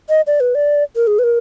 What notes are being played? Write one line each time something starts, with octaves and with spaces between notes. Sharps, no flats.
D#5
D5
B4
D5
A#4
G#4
B4
A#4